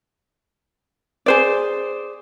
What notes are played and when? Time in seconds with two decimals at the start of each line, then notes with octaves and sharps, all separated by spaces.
1.26 G#4 C5 D5